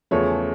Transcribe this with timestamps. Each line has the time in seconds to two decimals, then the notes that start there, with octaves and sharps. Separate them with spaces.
0.11 E2 C#3 F3 A3 C#5